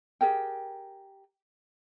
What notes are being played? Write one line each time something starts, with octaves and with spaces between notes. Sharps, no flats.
G4 G#4 A#4 G5